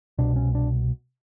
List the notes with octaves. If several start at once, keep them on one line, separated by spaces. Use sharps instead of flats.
C2 B2 D4
C#4
D4